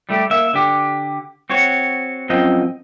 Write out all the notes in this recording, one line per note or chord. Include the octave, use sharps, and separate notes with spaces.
G3 A3 G4
A#3 E5
D3 G4
C4 F#4 C#5
F#2 F3 C4 D#5 G5